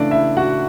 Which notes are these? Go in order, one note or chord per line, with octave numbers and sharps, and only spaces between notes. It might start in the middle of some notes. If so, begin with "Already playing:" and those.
Already playing: C#3 E3 A3 D4 D5
E4 E5
F#4 F#5